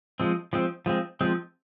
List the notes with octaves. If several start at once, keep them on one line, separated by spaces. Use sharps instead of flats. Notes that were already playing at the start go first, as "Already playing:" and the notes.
F3 G#3 C4
F3 G#3 C4
F3 G#3 C4
F3 G#3 C4